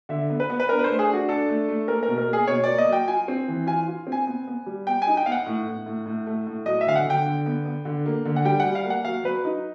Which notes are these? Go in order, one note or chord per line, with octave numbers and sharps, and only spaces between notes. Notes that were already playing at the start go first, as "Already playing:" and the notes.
D3 E5
B3
B4
B3
B4
D4 A#4
B4
C5
A3
G#4
D4
F#4
D4 A4
A3
A3
A#3 A#4
A#4
B2
A#4
A#3 G#4
B2 C#5
A#3 D5
D#5
F#3 G5
F4 G#5
C4
E3
F4 G#5
F4
C4
G#5
B3
B3
G3
B3 G5
G#5
D#4
G5
B3 F5
F#5
A2
A2
A2
A2
A3
A2
F#3 D#5
E5
D3 F5
F#5
D3 G5
D3
B3
B3
D3
A#3
D3
F#5
G3 G5
F#5
G3
F5
A#3
F#5
F#3 F5
F#3 B4
D#4